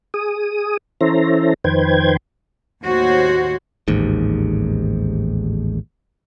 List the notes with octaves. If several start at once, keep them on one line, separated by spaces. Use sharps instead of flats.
G#4 D#6
E3 C#4 E4 A4 C5 A#5
F2 D#3 B4 C5 G5 G#6
D#2 A2 F#4 C5 C#5
A1 D#2 G#2